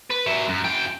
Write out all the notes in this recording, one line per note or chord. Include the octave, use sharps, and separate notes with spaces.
B4
F#3 E5
F#2
F#2 G5